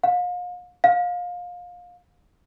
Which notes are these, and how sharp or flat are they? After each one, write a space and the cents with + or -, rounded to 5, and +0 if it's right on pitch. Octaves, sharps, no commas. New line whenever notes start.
F5 +40
F5 +25